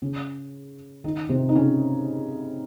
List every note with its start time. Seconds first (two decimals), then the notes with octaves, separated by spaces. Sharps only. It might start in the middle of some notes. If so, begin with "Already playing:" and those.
0.02 C#3 C#4
1.04 D#3 D#4
1.29 C3 C4
1.49 D#4
1.55 C#3 C#4